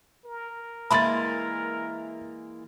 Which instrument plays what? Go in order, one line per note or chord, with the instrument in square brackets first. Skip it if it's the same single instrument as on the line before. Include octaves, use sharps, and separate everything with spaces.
[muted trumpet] A#4
[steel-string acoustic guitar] E3 G#3 A#3 [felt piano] E5 A6 [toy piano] B5 C6